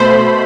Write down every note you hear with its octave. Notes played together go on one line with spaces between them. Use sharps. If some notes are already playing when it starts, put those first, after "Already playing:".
Already playing: B2 A3 C5 B5